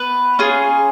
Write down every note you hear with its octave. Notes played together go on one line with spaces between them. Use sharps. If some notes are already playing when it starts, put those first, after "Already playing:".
Already playing: B3 B4
C#4 F4 G#4